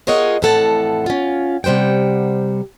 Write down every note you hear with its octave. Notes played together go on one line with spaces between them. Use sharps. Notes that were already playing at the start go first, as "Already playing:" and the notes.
F4 G#4 A#4 C#5 D#5 F#5
F2 A2 E3 A4 F#5 A5
C#4 F4
C3 G3 C5 F#5 G5